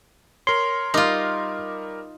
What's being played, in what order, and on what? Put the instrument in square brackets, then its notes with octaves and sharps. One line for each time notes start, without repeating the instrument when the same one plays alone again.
[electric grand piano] A#4 C#5 [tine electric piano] C6
[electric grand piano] G3 A#4 D6 [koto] D#4 F4